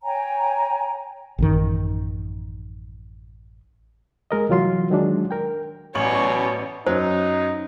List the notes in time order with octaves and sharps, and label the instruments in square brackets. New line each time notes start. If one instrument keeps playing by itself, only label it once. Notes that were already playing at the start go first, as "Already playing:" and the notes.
[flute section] C#5 G5 G#5 A#5
[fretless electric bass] A1 F#2 D#3
[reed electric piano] G#3 A#4 D#5
C2 E3 F#3 F4 C6
D#3 F#3 G#3 D4
A#4 G5
[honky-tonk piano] A1 C#6 F#7 [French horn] B2 [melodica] F#3 C#4 [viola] C#5 D5
[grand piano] F#2 F#3 [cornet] D#4 [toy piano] C5